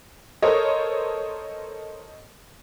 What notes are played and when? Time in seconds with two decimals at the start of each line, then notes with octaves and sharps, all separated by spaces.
0.42 A4 A#4 C5 C#5 D#5